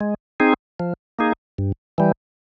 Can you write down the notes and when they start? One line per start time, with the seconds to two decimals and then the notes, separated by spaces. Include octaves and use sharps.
0.01 G#3
0.40 C4 D#4 G#4
0.80 F3
1.19 A#3 D#4 G#4
1.58 G2
1.98 E3 G3